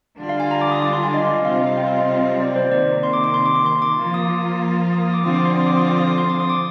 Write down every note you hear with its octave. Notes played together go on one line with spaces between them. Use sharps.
D3 G3 D4 F4
F5
G#5
A#5
D6
D#6
D6
C6
G#5
D#5
F5
D#5
C3 G3 C4 F4 F5
F5
D#5
G5
F5
D#5
D5
C5
C3 D#3 A#3 D5
C6
D6
D6
C6
D6
D6
C6
D6
F3 A#3 F4
D#6
D#6
D#6
D6
D3 F3 C4 F4 D#6
D6
C6
D#6
D6
D#6
D6
D#6
D6
C6
D6
D#6
D6